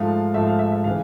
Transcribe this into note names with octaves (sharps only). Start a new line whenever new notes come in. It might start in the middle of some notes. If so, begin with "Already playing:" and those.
Already playing: G#2 F3 A3 F5
G#2 F3 A3 E5
F5
E5
E5
C#3 E3 F5